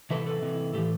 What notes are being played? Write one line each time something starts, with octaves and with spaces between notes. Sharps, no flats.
C3 E3 A4 B4
A4 B4
C3 E3
A2 E3 G4 A4